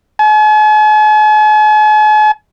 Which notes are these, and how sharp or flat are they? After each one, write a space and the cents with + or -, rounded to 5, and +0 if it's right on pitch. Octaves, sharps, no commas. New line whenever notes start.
G#5 +45